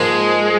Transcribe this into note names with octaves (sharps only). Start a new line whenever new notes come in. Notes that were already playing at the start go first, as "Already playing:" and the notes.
Already playing: G#2 F3 G#3 A#3